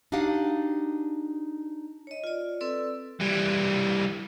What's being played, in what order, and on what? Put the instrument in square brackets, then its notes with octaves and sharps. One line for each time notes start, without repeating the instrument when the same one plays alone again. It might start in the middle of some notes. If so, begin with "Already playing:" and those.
[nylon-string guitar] D4 D#4 F#4 G4 F5 F#5
[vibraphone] C#5 D#5
F4 D5
C4 A4 B4 D5 E6
[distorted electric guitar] E3 G3